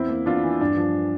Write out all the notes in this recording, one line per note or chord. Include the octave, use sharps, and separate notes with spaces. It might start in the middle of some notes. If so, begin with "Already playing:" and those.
Already playing: E2 C4 E4
A#3
E2 D4 F4
E3
G2 D4
F3